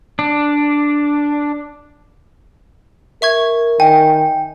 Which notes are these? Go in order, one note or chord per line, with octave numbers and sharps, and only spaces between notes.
D4
A#4 E5 C#6 G#6
D#3 G5 G#5